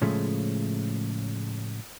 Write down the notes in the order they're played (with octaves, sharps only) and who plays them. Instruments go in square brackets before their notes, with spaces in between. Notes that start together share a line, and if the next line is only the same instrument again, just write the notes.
[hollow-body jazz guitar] A2 C#3 F3 G#3 A3